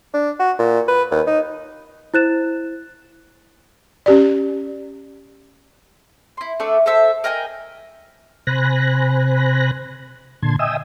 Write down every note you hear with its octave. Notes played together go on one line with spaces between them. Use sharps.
D4
F#4
A#2
B4
D#2
D#4
E4 C5 F#6 A6 E7
C#4 G4 D5
E4 C6
A3 D4 A4 D5
A4 C5 E5 A5
A#4 D#5 G5 G#5
C3 C5 G#5 B5 F#6 A#6
A#2 D3 A5 C6 G#6
D#5 E5 G5 G#5 D#6 E6